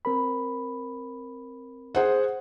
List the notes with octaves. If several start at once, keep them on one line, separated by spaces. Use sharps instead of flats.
C4 A#4 B5
G#4 C5 F#5